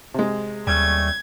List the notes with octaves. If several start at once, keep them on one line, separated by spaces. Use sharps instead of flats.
C3 G#3
D#2 G3 A3 C#4 G#6